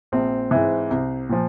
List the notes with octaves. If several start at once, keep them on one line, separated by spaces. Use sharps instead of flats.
A#1 C4
G#2 E3
C2
A#2 F3